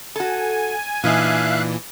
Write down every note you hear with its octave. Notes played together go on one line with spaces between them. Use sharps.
F#4 A4 G#5
A#2 E3 D4 D#4 E5 F5 F#6